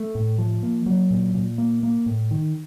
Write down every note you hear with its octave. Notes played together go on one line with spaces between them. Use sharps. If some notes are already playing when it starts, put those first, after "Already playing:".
Already playing: A3
A2
F3
A#3
F#3
A#2
A#2
A#3
A#3
A2
D#3